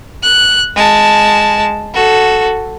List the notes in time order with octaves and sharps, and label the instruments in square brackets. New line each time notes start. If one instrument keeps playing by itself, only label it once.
[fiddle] F#6
G#3 A5
F#4 A4